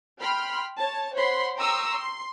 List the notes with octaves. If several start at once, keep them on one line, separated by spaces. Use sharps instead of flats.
G5 B5 C6 F6
C#5 A5
C5 C#5 F#5 B5 C6
G5 A#5 C6 C#6 D#6 E6
C6